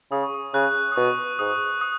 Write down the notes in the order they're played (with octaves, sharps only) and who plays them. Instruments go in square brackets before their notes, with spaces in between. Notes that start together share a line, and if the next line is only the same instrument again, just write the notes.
[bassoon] C#3 [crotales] D#6
[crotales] C#6
D#6
[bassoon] C#3 [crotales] F#6
[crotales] D#6
[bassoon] B2 [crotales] C#6
[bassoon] G#2 [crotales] D#6
[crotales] D#6